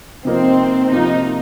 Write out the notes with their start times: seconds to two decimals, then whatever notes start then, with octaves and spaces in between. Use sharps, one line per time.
0.25 C3 F3 A#3 C4 D#4 A#4
0.91 C3 F3 A#3 D#4 F4